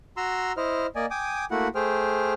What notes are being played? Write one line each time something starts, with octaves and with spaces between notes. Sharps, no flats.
F#4 A#5 C6 E6
E4 C5 D#5 F6
A#3 D5 D#5 G#5
G5 G#5 D6 D#6
A3 A#3 E4 F#4 F#5
A3 G#4 C5 G5 F6